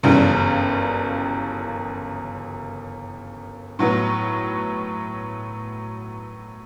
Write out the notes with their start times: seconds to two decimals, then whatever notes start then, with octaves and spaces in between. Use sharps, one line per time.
0.03 G1 F#2 C#3 E3 G3
3.79 A2 F#3 B3